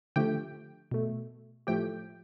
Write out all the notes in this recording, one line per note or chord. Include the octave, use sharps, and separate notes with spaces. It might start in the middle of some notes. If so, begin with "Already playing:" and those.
D3 F3 A3 G4 G5
B2 A3
A2 F3 A3 G4 G5